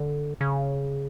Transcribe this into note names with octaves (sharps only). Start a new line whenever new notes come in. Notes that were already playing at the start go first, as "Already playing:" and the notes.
Already playing: D3
C#3